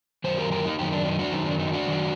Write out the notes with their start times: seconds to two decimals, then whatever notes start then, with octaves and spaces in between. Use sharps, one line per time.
0.24 F#2 D#3 F#3 C5
0.38 G4 A#4
0.51 G4 A#4
0.65 D#4 G4
0.79 F#2 D#3 F#3 D#4 G4
0.92 D4
1.06 D#4
1.19 D4 F#4
1.32 F#2 D#3 F#3 D#4
1.46 D4
1.59 D#4
1.73 D4 F#4
1.87 F#2 D#3 F#3